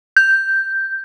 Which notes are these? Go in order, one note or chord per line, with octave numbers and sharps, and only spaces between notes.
G6